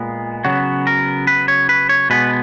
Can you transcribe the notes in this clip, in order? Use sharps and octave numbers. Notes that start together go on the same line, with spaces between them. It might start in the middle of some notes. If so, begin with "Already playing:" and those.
Already playing: A#2 G#3 B3
C#3 F#3 B3 F#4
A#4
B4
C#5
B4
C#5
B2 G#3 B3 B4